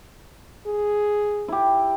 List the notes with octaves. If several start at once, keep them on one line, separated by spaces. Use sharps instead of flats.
G#4
E4 G4